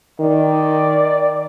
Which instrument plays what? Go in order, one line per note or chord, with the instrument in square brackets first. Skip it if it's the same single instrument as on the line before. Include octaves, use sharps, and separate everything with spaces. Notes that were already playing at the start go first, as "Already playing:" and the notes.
[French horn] D#3 [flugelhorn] D5